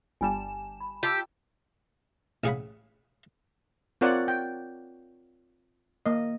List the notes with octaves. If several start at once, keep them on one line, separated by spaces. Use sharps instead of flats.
G1 G3 G#5 A5 E7
B5
F4 G4 D#5 A5 E6
A1 C#4 G#4 F5 F#5 B5
C4 F4 A#4 C#5 D5 F#5
G5
A#3 D#5